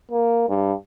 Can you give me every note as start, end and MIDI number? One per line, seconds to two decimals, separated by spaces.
0.11 0.46 58
0.49 0.73 43